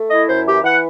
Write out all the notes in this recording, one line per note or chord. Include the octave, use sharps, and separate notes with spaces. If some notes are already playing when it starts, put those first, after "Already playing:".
Already playing: A3
E4 D#5
F#2 C5
E3 G4
E3 F#5